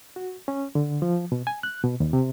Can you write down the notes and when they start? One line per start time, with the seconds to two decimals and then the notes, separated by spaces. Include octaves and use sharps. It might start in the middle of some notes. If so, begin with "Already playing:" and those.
0.16 F#4
0.48 C#4
0.75 D3
1.02 F3
1.32 B2
1.47 G#5
1.63 F#6
1.84 B2
2.00 D#2
2.13 C3